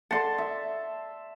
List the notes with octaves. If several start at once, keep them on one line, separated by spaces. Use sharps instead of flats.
A4 D5 F#5 A5 C6
E5